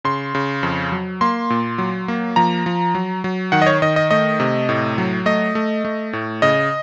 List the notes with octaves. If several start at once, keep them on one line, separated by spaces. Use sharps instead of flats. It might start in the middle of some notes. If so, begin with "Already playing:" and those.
C#3 C6
C#3
F2
F#3
A#3 C6
A#2
F#3
A#3
F3 A#5
F3
F#3
F#3
D#3 F#5
D#5
C#5
D#3 D#5
D#5
A3 D#5
C3
A2
F#3
A3 D#5
A3
A3
A2
C#3 D#5